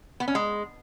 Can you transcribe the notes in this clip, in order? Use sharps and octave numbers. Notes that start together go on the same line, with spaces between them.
B3
C#4
G#3